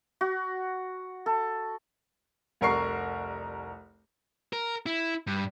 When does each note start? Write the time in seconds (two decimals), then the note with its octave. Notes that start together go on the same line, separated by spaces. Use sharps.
0.21 F#4
1.26 A4
2.61 F1 C2 A#4 C#6 C7
4.53 A#4
4.86 E4
5.27 G2